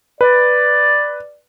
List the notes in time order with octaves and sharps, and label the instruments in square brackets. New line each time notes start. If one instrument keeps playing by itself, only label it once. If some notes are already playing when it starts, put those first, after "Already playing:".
[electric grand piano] B4 [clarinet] D5